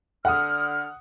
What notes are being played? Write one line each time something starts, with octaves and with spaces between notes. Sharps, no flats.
D3 F#5 D#6 F6